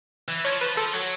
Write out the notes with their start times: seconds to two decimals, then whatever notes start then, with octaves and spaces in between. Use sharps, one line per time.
0.28 E3
0.44 F3 C#5
0.61 B4
0.77 F3 A4
0.94 F#3